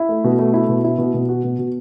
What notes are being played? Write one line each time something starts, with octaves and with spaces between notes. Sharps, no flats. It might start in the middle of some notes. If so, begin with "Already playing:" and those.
Already playing: E4
A3
B2
A3
E4
B2
E4
B2
B2
F#4
B2
B2